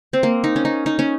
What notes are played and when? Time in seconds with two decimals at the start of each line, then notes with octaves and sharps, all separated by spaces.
0.13 C4
0.23 A#3
0.44 D#4
0.56 C#4
0.65 D#4
0.86 D#4
0.99 C#4